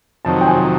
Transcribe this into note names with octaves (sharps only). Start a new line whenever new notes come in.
F2 C3 D#3 F#3 A5
G5
G#5